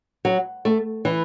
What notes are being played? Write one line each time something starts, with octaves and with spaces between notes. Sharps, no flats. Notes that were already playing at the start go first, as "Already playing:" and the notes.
F#3
A3
E3